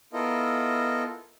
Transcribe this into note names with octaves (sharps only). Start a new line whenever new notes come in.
B3 E4 F4 A4 A#4 D#5